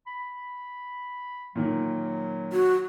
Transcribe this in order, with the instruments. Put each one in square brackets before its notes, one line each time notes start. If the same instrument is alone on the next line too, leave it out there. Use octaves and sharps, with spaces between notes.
[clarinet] B5
[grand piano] A#2 D#3 [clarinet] F#3
[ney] F#4